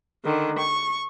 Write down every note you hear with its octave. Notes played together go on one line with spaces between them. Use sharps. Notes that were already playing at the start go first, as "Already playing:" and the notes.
D3 D#3
C#6